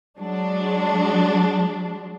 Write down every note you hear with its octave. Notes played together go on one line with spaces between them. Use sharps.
F#3 G#3 D4